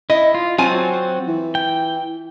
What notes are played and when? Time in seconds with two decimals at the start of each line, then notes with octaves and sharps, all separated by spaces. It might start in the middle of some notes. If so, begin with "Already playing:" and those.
0.10 E4 D#5
0.35 F4
0.58 F#3 C4 F4 F#4 G#5
1.27 E3
1.55 G5